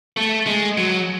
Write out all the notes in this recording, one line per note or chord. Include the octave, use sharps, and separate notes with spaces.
A3
G#3
F#3